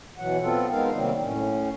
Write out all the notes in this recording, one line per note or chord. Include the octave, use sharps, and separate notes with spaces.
B2 E3 F#3 F#5
B3 C4 F4 A4
G#3 B3 D#4 A#4 F5
C3 D#3 F#3 G3 A#3 C4
A2 C#4